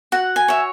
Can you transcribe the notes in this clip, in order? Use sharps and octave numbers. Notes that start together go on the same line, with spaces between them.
F#4 F#5
G#5
C#5 E5